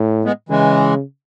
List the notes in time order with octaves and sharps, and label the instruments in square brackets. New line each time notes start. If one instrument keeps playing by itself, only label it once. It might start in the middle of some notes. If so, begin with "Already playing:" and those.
Already playing: [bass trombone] A2
[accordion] G#3 B3
[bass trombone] C#3 [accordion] E3 G#3